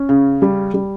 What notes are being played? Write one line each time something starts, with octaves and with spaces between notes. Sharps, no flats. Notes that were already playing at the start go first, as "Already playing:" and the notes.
Already playing: C#4
C#3
G3
G3